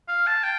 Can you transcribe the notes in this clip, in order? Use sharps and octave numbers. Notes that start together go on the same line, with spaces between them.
F5
A5
G5